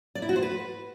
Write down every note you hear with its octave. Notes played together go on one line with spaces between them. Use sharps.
D5
E4
F#4
C5
B4